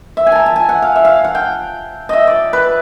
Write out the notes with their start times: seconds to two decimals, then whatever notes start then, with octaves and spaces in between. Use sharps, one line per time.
0.17 E5
0.27 G#5
0.32 A5 A#5
0.46 A5
0.56 G#5
0.69 F#5
0.82 F5
0.96 E5
1.05 F5
1.24 F#5
1.35 G5
2.09 D#5 E5
2.27 D5
2.53 B4